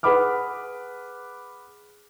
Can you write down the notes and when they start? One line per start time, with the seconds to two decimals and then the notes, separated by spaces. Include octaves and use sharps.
0.03 G#4 B4 F#5 B5 D6 F6